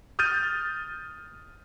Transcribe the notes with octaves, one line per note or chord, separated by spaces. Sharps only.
D#6 F6 G6 A6 D#7